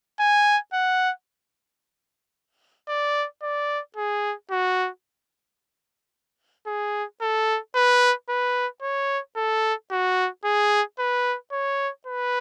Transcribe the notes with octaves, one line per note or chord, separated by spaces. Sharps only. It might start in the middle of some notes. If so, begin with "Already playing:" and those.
G#5
F#5
D5
D5
G#4
F#4
G#4
A4
B4
B4
C#5
A4
F#4
G#4
B4
C#5
B4